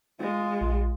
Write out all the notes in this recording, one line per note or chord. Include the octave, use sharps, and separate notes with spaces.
G#3 F4
A#1